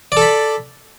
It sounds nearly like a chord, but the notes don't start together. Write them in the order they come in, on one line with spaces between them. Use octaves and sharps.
D5 A4 B5